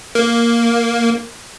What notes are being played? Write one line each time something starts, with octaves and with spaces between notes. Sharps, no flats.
A#3